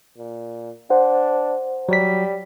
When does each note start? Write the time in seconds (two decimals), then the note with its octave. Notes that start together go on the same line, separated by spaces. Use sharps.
0.17 A#2
0.90 D4 C5 F#5
1.89 F#3 G3 B6